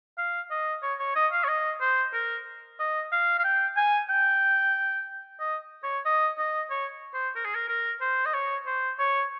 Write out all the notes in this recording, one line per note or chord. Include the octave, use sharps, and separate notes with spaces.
F5
D#5
C#5
C#5
D#5
F5
C#5
D#5
C5
A#4
D#5
F5
F5
G5
G#5
G5
D#5
C#5
D#5
D#5
C#5
C5
A#4
G#4
A#4
A#4
C5
D#5
C#5
C5
C#5